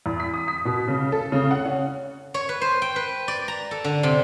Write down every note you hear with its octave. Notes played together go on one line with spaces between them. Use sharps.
E2
B6
D#6
B6
B2
C#3
A4
C#3
F#5
C#4
C#5
B4
C5
G5
B4
D5
A#5
A4
D3
C3